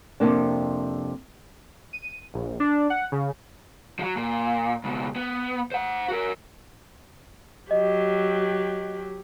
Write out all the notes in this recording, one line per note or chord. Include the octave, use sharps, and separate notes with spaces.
F2 G#2 C3 A#3 D4
D#7
A#1
D4
F#5
C#3
F3 F#3
A#2
C#2 B2
B3
C5 F#5
F#4 A#4
F#3 G4 D#5